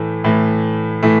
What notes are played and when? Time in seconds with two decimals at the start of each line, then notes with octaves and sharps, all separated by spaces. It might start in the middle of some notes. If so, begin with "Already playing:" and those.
Already playing: A2 E3 A3
0.24 A2 E3 A3
1.03 A2 E3 A3